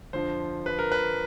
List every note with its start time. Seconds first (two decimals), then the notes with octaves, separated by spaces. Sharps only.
0.13 F2 D3 F3 C5
0.66 B4
0.79 A#4
0.92 B4